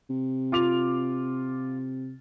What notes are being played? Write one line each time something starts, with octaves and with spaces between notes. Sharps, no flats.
C3
F4 D6 F7